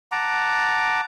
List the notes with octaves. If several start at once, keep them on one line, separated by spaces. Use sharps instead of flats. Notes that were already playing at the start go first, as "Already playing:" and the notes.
F#5 A5 A#5 D6